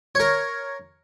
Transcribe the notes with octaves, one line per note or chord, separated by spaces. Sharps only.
A#4 C#5